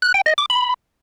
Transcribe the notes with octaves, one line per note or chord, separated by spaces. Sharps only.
F#6
G5
D#5
D6
B5